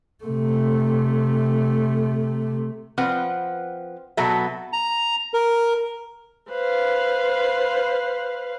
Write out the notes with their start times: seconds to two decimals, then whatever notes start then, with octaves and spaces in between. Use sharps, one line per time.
0.24 C3 A3
2.98 F3 C4 B4 F#5
4.17 B2 F#3 A4 E5
4.73 A#5
5.34 A#4
6.50 B4 C5 F5